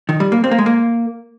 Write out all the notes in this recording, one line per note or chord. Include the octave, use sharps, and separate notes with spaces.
D#3
G3
A#3
C4
A#3
G#3
A#3